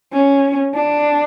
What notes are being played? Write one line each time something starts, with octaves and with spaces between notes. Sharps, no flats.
C#4
D4